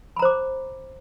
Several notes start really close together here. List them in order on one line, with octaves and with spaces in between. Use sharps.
B5 A#5 C5 D6